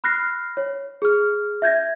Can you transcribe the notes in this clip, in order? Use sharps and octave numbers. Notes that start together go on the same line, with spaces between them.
B5 F6 F#6 A#6 C7
C#5
G#4 F6
E5 G6 G#6 A#6